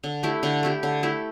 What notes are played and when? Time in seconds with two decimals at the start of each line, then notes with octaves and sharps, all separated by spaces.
0.04 D3
0.23 A3 E4 G4
0.43 D3
0.63 A3 E4 G4
0.83 D3
1.03 A3 E4 G4